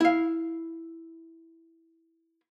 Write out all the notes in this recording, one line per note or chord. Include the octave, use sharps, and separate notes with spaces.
E4 F5